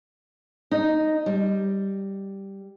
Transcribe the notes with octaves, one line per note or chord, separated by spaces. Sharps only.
D#4
G3